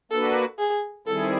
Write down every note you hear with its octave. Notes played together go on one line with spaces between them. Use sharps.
A#3 D4 F#4 A4 B4
G#4
D#3 G3 C4 E4 G#4 A4